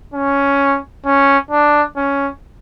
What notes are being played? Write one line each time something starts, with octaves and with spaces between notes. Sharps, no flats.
C#4
C#4
D4
C#4